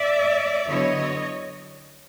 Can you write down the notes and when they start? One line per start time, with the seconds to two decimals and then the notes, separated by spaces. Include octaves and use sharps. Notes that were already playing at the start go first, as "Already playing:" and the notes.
Already playing: D5 E5
0.67 D3 F#3 B3 E4 C#5 D#5